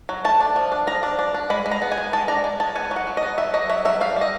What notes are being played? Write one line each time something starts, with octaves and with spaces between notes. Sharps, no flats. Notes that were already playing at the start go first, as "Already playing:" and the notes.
F#3
A3 A5
D4
F3
D4
F3 A#5
D4
D4
D4
G#3 B5
G#3
A#5
B3
G#5
G#3
G#3 A5
D4 A#5
G#3
G#3 A5
B3 G#5
F#3
F#5
F#3
D#5
B3
F#3 E5
F#3 D#5
F#3 E5
F#3 E5
G3 F5
G3 D#5